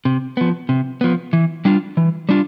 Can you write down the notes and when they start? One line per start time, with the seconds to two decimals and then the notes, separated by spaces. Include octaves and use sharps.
0.05 C3
0.37 F3 B3
0.69 C3
1.01 F3 B3
1.33 E3
1.65 G3 D4 F4
1.97 E3
2.29 G3 D4 F4